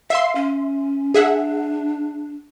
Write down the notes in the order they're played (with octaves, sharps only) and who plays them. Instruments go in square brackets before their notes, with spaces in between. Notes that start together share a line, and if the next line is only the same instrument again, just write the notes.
[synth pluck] E5 C6 [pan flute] F5
[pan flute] C#4
[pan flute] D4 [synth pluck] G#4 E5 F#5